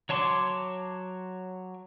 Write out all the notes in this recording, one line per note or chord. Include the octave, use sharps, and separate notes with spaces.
F#3 C#5 A5 C6 D6